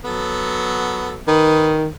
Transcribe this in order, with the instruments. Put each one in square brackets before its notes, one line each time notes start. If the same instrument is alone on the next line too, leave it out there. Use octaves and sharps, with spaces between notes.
[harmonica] F#3 B3 A4
[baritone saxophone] D#3 [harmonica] B4 D#6